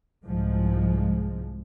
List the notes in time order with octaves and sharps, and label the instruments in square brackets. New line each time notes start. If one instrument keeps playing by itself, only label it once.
[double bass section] C2 G#2 F3 G#3